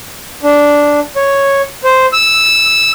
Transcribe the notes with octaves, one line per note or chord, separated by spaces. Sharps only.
D4
C#5
C5
E6